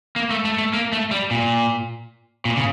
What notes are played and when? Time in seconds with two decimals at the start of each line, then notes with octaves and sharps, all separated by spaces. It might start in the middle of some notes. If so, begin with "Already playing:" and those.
0.16 A#3
0.30 A3
0.45 A3
0.58 A3
0.73 A#3
0.93 A3
1.11 G3
1.31 A#2
2.45 A#2
2.57 C#3